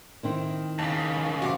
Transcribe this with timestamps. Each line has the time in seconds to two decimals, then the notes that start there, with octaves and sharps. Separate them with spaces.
0.23 D#3 C4 E4
0.79 D#2 C#3 A5
1.42 F#2 C3 D#3 F#4 F5 D6